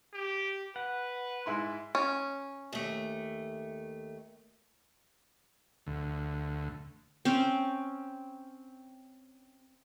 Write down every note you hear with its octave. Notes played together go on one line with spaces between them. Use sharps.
G4
B4 F#5
G#2 E4 C6
C#4
D#2 A3
D2
C4 C#4